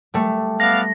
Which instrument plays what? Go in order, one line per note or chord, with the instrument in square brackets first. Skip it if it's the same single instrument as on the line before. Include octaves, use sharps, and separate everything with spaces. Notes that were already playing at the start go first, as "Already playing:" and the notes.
[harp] G3 A3
[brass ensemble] B3 D5 F5 [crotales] A#6